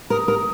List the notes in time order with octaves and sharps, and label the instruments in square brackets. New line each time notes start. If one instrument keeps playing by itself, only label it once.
[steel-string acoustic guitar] A#4 [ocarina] D#6
[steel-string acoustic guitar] A#4